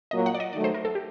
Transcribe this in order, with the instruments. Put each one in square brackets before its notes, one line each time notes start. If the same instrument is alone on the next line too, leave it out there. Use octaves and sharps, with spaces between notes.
[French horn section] A#2 F#3 A#3 [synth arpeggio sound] D#5
[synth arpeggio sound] F#5
D5
D#5
[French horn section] D#3 F#3 A3 [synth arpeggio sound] D5
[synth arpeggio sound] C5
A#4
A4
G4